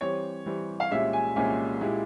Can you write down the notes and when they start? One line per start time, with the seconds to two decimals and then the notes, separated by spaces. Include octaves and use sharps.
0.01 E3 G3 C4 G4 C#5
0.46 E3 G3 C4 G4
0.80 F5
0.91 C2 A#2 G#3 C#4 G4 E5
1.13 G#5
1.36 C2 A#2 G#3 C#4 G4 G#5
1.81 A#2 G#3 E4 G4